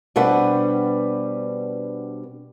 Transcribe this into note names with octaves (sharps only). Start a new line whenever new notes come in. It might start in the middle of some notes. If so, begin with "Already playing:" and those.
B2 G3 C4 D4 B4 F#5